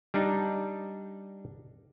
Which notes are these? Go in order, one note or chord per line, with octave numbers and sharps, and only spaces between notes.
G3 D4 D#4